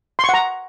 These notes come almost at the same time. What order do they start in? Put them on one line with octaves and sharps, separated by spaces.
C6 C#6 F#5 A#5